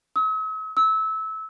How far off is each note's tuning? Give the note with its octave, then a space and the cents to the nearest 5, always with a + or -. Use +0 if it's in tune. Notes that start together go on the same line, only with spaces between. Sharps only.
E6 -45
E6 -25